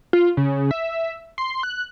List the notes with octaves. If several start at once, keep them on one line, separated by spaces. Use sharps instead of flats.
F4
C#3
E5
C6
F#6